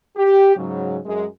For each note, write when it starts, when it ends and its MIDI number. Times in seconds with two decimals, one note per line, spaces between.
0.17 0.56 67
0.56 0.99 44
0.56 0.99 49
0.56 0.99 54
1.06 1.26 42
1.06 1.26 56